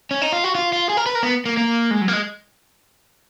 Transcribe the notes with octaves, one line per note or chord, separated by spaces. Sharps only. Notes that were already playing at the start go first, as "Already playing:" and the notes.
C#4
D#4
F4
F#4
F4
F4
G#4
A#4
B4
A#4
B3
A#3
A#3
G#3
F#3
A#3
G#3